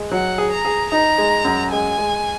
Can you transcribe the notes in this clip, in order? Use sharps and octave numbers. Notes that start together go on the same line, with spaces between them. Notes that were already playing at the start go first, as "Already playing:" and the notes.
Already playing: G#3
F#3 F#5
G#4
A#5
G#4
D#4 A#5
G#3
F#2
G#3 G#5
G#3